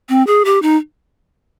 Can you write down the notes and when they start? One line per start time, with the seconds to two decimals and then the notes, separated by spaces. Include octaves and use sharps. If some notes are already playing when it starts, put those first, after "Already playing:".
0.09 C4
0.27 G#4
0.45 G4
0.62 D#4